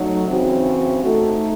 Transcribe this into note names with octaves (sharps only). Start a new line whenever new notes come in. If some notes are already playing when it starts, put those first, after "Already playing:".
Already playing: F#3 A3 D#4
C#3 E3 C4 F#4
A3 D#4 A4